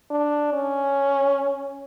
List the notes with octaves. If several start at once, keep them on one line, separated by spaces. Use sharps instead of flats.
D4
C#4